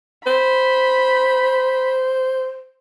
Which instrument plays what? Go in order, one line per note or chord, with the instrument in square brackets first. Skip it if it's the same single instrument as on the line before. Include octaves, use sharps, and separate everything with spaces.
[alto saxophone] C5 [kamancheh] B5